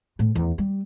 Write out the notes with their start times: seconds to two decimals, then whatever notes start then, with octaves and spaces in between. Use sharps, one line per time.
0.19 A2
0.35 E2
0.58 G3